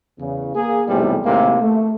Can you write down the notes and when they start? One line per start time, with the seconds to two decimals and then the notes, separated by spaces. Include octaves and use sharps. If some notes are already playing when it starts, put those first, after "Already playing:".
0.20 E2 C#3
0.55 A#3 G#4
0.88 B1 E2 A2 C3 G3
1.25 D#2 A2 C3 G#3 A#3
1.62 A3